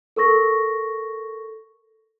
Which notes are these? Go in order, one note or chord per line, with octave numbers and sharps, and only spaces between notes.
A4 A#4 C#6 A#6